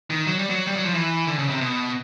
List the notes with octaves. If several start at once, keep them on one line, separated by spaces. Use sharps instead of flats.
D#3
F#3
G3
F#3
G3
F#3
F3
E3
D3
C#3
C3
B2